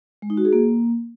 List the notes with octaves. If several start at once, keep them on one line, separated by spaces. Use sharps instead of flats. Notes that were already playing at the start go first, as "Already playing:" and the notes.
G#3
D#4
F#4
G#4
A#3